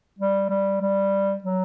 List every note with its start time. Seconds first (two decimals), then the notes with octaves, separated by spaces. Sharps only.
0.19 G3
0.49 G3
0.81 G3
1.44 F#3